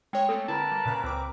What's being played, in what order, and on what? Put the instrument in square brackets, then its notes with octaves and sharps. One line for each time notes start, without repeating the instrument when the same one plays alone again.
[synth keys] G#3 C#5 [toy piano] G5
[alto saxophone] A3 [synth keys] A#3 C4 [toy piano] A4
[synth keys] D3 E4 [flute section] A#4 B4 A#5 [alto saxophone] A5
[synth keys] G3
A#2 C#3 F#6
[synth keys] C#2 D6 [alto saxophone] C4